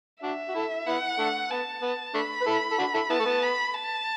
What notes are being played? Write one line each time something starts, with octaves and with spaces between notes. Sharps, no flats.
D4 F#4 E5
F#4
E4 A4
B3 E4 F#5
A3 D4
B3 A5
B3
A3 D4 B5
B4
E4 A4
A4
D4 F#4
E4 A4
B3 E4 A5
A3
B3
B5
A5